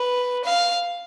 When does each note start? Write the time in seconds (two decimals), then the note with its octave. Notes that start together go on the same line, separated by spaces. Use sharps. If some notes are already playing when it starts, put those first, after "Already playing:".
Already playing: B4
0.44 F5